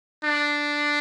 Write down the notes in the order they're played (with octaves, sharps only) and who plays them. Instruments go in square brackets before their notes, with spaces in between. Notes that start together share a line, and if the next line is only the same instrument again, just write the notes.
[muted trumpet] D4